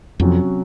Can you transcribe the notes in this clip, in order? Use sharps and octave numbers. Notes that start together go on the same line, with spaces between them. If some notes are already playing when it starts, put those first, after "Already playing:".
F2 C3 F#3 C#4 F#4